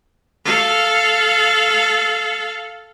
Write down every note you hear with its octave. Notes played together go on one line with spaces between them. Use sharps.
A4 F5